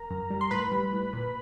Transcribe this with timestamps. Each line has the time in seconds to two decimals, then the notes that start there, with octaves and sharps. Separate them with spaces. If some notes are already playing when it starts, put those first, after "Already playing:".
Already playing: A#4 A#5
0.10 F#2
0.30 G3
0.41 C6
0.51 A2 B4 B5
0.72 G3
0.92 A2
1.13 A#2